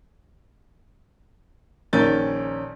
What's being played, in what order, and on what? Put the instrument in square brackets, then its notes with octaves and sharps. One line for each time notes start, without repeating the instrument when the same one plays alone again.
[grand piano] A#1 D#3 C#4 A#4 G6 A6